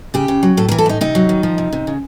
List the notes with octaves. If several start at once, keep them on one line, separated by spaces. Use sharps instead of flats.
C#3 G4
C#3
F#3
A2 A4
A#4
E3
A4
A2 D#4
C3 D#4
F#3
D#3
F3
C3
C3
C#3